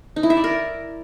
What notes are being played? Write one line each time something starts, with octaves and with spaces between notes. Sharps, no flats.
D#4
E4
E5
D5
A#4